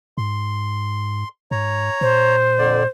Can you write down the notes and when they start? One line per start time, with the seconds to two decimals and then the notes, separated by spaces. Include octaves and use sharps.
0.18 G#2 C6
1.51 G#2 C#5 A#5
2.01 A#2 C5
2.59 F2 D3 D5